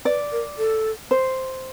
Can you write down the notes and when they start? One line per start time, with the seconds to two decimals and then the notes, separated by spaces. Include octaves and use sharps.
0.05 B4 D5
0.32 A#4
0.58 A4
1.11 C5